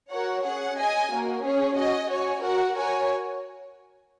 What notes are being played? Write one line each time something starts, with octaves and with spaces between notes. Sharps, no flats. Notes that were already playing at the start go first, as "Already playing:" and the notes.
F#4 A#4 C#5 F#5
C#4 G#4 F#5
G#4 D#5 G#5
A#3 F#4 A#4
C#4 G#4 C#5
F#4 D#5 G#5
F#4 C#5 G#5
F#4 A#4 F#5
F#4 A#4 C#5 G#5